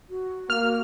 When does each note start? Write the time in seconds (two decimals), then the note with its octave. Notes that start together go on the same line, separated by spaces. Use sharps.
0.10 F#4
0.50 A#3 F6